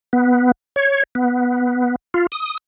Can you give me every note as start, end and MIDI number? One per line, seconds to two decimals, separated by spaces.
0.13 0.52 59
0.76 1.03 73
1.15 1.96 59
2.14 2.27 65
2.32 2.57 87